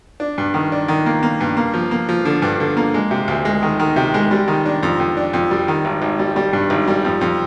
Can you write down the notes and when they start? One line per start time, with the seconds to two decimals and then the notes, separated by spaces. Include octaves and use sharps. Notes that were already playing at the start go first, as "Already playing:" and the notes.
0.20 D4
0.38 G2
0.54 D#3
0.72 D4
0.88 D#3
1.06 A#3
1.23 A#3
1.41 G2
1.57 A#3
1.74 F3
1.91 A#3
2.09 F3
2.25 D3
2.42 G2
2.60 D3
2.77 A#3
2.94 G#3
3.11 C3
3.28 D2
3.45 G#3
3.62 D#3
3.79 D#3
3.96 C3
4.14 G#3
4.31 G3
4.48 D#3
4.66 D4
4.83 F2
5.00 F2
5.17 D4
5.33 F2
5.51 G3
5.68 D#3
5.85 G#1
6.02 G#1
6.19 G3
6.36 G3
6.53 G2
6.70 G#1
6.88 G3
7.05 F2
7.21 F2